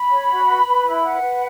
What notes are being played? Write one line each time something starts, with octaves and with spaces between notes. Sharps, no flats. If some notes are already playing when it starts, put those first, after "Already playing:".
Already playing: B5
C#5
F#4
B4
B4
E4
B4 F#5
B4